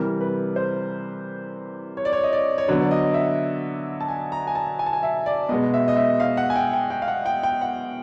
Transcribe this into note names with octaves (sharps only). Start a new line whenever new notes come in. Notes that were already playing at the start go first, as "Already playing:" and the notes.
Already playing: C3 E3 G3 A#4
B4
C5
C#5
D5
C#5
D#5
D5
C#5
D3 F#3 B3 D5
D5
D#5
E5
A5
G#5
A#5
G#5
A5
G#5
A5
G#5
E5
D5
B2 G#3 B3 D#5
E5
D#5
E5
F5
F#5
G#5
G5
G5
G5
F5
F#5
G5
G5
F#5